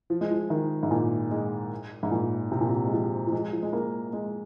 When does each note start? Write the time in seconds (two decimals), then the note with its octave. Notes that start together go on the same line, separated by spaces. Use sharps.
0.10 F3
0.21 G#3
0.31 F3
0.50 D#3
0.83 G#2
0.91 A#2
1.31 G#3
2.03 G#2
2.11 A#2
2.52 C3
2.60 A#2
2.69 C3
2.87 G#3
2.93 F3
3.27 F3
3.32 G#3
3.53 F3
3.63 G#3
3.73 A#3
4.13 G#3